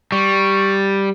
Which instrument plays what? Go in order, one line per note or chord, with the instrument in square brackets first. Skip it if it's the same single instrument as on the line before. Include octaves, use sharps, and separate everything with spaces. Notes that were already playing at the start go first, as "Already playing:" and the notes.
[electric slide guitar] G3 [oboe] C#6